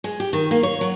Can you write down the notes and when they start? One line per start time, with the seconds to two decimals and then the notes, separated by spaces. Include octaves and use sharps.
0.04 G#3
0.20 G4
0.33 D#3
0.51 A#3
0.63 C#5
0.81 F#3